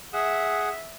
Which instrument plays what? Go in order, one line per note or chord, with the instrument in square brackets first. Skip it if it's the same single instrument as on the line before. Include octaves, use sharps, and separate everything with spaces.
[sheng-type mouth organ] G#4 F#5 [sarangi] E5